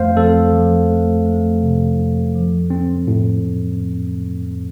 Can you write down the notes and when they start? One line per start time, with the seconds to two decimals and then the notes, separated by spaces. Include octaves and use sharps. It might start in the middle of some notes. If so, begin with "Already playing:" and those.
Already playing: F2 A3 C5 F5
0.16 F2 A4
0.53 F3
0.89 A3
1.26 A3
1.62 C3
1.98 F2
2.35 F3
2.70 C4
3.08 A2